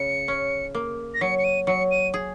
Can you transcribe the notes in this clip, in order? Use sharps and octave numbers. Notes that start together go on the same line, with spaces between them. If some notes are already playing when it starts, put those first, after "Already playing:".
Already playing: C#3 C#7
C#4
A#3
A#6
F#3 C#7
C#7
D#7
F#3 C#7
D#7
G#4